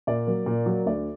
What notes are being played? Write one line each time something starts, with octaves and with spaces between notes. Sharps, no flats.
A#2 D5
F#3 A#3
A#2
F#3 A#3
D2 D5